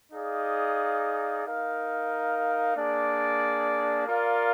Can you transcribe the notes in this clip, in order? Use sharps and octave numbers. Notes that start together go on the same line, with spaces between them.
D#4 G#4 D5 F5
D#4 A#4 F5
A#3 D4 G#4 D5
F4 A#4 D5 F5